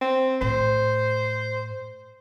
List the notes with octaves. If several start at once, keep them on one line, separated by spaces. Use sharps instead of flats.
C4
A2 C5